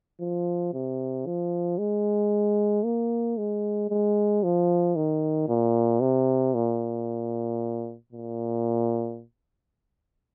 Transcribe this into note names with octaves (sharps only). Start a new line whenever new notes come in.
F3
C3
F3
G#3
A#3
G#3
G#3
F3
D#3
A#2
C3
A#2
A#2